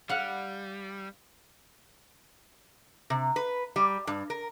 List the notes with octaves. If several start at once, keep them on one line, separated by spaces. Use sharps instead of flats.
G3 F5 F#5
C3
B4
G3
G2
A#4